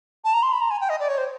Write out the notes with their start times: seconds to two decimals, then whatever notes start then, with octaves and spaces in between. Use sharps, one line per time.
0.24 A5
0.34 A#5
0.43 C6
0.52 B5
0.61 A#5
0.71 G#5
0.81 G5
0.90 D#5
1.00 D5
1.09 C#5
1.18 C5